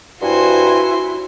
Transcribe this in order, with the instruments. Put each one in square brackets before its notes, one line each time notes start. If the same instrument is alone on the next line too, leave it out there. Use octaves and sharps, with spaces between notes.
[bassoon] G2 [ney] E4 [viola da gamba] F#4 C5 [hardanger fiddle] G#5 C6